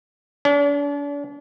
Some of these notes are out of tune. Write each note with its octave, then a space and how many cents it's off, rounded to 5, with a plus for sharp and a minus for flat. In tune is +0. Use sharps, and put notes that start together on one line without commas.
D4 -40